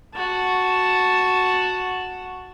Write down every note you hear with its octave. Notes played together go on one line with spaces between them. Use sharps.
F#4 A5